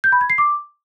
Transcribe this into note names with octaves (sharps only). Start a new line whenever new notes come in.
G6
B5
G#6
C7
D6